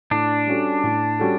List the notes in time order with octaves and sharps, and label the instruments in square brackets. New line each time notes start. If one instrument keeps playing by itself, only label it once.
[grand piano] A2 [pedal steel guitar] D4
[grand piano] G3 C#4 F#4 A4
A2
G3 C#4 F#4 A4